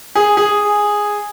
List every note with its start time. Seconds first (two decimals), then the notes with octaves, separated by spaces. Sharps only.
0.15 G#4
0.37 G#4